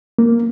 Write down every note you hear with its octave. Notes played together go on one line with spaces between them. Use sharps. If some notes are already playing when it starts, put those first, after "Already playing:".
A#3